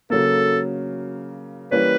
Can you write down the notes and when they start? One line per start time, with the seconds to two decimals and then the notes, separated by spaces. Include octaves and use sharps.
0.10 C#3 F#3 A#3 A4
1.71 E3 G3 A#3 C#4 B4